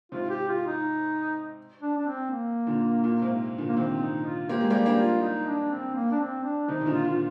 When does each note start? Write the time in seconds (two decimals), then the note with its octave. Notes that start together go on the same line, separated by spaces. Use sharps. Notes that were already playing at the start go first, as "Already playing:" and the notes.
0.12 G#2 C3 F4
0.30 G4
0.49 F4
0.66 D#4
1.82 D4
1.97 D4
2.07 C4
2.31 A#3
2.67 A#2 D3
3.04 A#2
3.21 G#2 C3
3.58 A#2 D3
3.69 A#3
3.76 C3 D#3 C4
4.01 D#4
4.25 F4
4.49 A#3 G4
4.60 G#3
4.70 G3 A#3
4.74 G4
4.86 A#3 D4
4.98 F4
5.22 D#4
5.46 D4
5.71 C4
5.95 A#3
6.11 D4
6.20 C4
6.44 D4
6.68 C3 D#3 D#4
6.81 C3
6.86 A#2 D3
6.93 F4
7.05 A#2
7.10 F4